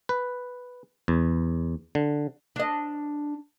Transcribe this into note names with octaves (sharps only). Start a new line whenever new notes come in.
B4
E2
D3
D4 D#5